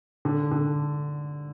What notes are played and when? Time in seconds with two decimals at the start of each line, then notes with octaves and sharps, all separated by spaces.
0.25 D3
0.51 D3